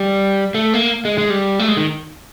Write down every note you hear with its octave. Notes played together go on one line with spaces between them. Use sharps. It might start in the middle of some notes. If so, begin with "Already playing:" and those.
Already playing: G3
A3
A#3
G#3
G#3
G3
A3
G#3
D#3